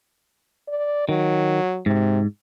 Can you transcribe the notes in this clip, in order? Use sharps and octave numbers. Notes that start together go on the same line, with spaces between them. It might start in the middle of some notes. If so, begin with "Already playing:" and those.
D5
D#3 F#3
G#2 C3